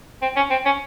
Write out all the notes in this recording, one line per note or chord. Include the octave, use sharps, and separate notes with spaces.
C4
C#4
C4
C#4